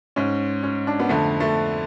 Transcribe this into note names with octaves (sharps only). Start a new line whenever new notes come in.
G#2 C#4
C#4
D4
B3
F2 D3 A3
A3